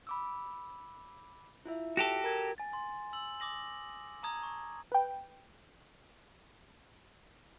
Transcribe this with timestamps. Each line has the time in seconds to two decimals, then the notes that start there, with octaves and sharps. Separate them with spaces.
0.07 B5 D6 E6
1.65 E4 F4 E5
1.97 F#4 G4 A4
2.24 A#4 A#5 G#6
2.58 G#5 A6
2.73 C6
3.13 E6 F#7
3.40 D6 D#6 A#6 F#7
4.23 A5 A#5 D#6 G#6
4.43 C#6
4.92 B4 G5